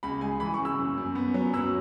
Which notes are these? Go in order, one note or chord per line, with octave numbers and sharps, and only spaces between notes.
C#2 B5
G#3 G#5
E3 B5
C#6
C#3
E6
F#2
F#2
B3
F#3
F#2 E6